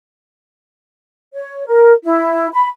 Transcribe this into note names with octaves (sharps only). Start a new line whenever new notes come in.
C#5
A#4
E4
B5